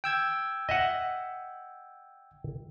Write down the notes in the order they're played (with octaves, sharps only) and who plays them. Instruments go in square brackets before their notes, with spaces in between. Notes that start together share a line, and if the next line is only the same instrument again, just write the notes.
[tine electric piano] G5 E6 G#6
[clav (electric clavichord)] D#5 E5 F#5